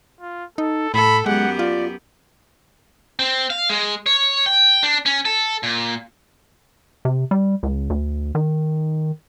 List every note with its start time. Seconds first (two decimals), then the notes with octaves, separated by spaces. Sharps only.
0.21 F4
0.58 D#4 A4
0.94 A2 A4 B5
1.26 F#2 G#3 B3 G4 F#5
1.59 F4 D5
3.19 C4
3.50 F5
3.70 G#3
4.06 C#5
4.46 G5
4.83 D4
5.06 C#4
5.25 A4
5.63 A#2
7.05 C3
7.31 G3
7.63 C#2
7.90 D2
8.35 D#3